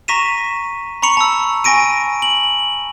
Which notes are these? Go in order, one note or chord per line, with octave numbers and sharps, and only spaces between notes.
A#5 C#6 A#6 B6 D#7 E7
A#5 B5 C#6 C#7 F7
A5 E6
G#5 C#6 A#6 D7 D#7
F#7